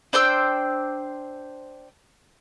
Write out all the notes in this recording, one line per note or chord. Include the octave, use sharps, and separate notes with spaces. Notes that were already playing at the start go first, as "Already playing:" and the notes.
D4 C5 G5 E6